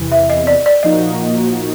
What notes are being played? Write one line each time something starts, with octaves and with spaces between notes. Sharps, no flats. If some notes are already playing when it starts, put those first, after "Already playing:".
Already playing: E2 C3 E3
E5
D#5
D5
D5
A#2 F3 A#3 D#4 F#4 D#5